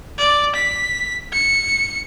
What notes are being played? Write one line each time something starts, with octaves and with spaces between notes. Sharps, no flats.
D5
B6
C#7